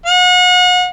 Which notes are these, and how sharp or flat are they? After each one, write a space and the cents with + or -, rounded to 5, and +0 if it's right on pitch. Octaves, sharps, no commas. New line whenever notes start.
F#5 -40